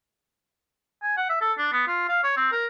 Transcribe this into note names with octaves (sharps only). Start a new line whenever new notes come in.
G#5
F#5
E5
A4
D4
B3
F4
F5
C#5
C4
A#4